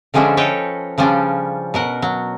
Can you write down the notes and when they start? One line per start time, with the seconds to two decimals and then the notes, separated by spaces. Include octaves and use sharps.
0.14 D3 F3 G#3 C#4 D4 E4
0.37 A4 B4 C#5 D#5 G5
0.98 C#3 F3 G3 C#4 D4
1.74 B2 A#4 F#5
2.02 F#3